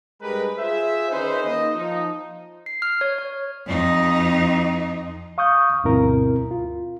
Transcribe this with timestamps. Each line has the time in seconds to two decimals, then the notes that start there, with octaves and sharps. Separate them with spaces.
0.22 G2 G#3 G4 A#4 B4
0.59 F4 G#4 C5 E5
1.11 D#3 C#4 D#4 G#4 B4 C5
1.43 A#3 D#4 C5 D#5
1.75 F3 D#4
2.66 C7
2.82 F6
3.01 C#5
3.19 C#5
3.66 F2 D#4
5.38 F5 C#6 D#6 F6 G6
5.84 D2 G2 B2 C4 E4 A#4
6.51 F4